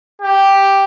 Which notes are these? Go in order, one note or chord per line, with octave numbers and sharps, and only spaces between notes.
G4